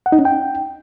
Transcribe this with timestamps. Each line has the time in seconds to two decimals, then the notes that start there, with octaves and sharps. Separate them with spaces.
0.06 F#5
0.12 D#4
0.19 C#4
0.25 G5